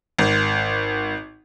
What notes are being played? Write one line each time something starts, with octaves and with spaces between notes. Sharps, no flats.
G#1